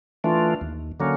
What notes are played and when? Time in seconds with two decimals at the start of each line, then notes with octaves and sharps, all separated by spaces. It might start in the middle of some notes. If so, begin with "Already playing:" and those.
0.24 E3 A3 D4 F4
0.61 D#2
1.00 D3 F#3 A#3 C#4